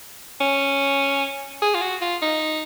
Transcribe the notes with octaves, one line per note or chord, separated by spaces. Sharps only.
C#4
G#4
F4
F#4
F4
D#4